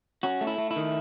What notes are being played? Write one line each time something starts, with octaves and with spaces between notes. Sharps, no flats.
C#4 F#4
A3
E4
A3
E4
D#3